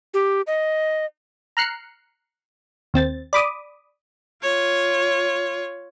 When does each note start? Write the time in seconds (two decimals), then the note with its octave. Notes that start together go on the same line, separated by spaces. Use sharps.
0.14 G4
0.47 D#5
1.57 A#5 F6 F#6 C7 C#7
2.94 D#2 C4 A6
3.33 D5 B5 D6 D#6
4.43 F4 C#5